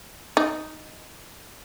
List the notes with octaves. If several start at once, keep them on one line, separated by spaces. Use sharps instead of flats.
D#4